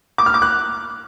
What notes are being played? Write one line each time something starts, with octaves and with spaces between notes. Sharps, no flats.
D6
F6
D6
F#6